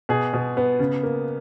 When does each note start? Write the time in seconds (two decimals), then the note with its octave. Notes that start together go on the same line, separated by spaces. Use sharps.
0.09 B2 G#4
0.33 B2
0.57 B3
0.79 C#3
1.03 A#3